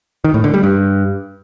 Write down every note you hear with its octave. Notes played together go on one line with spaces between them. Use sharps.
D#3
A2
D3
G3
G2